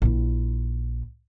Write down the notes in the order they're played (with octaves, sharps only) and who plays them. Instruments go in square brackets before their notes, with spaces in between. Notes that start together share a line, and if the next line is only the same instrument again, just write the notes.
[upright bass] A#1 E4